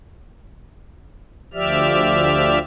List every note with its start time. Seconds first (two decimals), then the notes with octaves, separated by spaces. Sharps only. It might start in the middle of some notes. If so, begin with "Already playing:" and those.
1.54 D2 F3 G4 D5 E5 F6